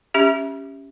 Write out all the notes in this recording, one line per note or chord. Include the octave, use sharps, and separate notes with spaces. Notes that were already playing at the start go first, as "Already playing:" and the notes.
C#4 G4 E5